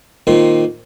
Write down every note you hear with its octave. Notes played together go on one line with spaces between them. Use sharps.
A#2 D#3 C4